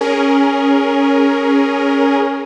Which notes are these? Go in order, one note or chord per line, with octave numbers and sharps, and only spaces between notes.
C#4 G#4 A#4